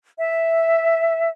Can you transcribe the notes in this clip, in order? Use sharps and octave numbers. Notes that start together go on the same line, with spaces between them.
E5